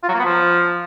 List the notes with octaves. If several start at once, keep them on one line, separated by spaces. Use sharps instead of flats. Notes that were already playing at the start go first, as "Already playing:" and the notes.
F4
F#3
A#3
B3
F3